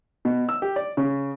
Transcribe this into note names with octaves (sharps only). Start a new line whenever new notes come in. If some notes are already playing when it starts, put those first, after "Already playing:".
B2
E6
G4
D5
C#3